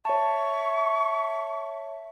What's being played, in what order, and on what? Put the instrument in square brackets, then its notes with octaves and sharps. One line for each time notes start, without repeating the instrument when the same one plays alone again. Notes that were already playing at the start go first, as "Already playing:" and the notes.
[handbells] C#5 A5 [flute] E5 [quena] C#6